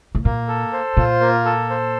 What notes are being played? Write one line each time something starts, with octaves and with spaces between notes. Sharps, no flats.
A2
A#2 A#3
A4
C5
A#2 F4
A#3
A4
C5